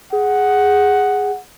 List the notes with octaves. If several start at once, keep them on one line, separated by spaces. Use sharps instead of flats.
G#4 F#5